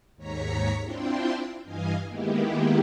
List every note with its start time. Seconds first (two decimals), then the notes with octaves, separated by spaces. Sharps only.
0.16 D#2 G#2 C#5 A#5 B6 C#7
0.83 C4 D4 E4 F4 G5 C6
1.64 G2 E3 D#5 F5 G#5
2.07 D#3 G#3 A#3 B3 E4 G4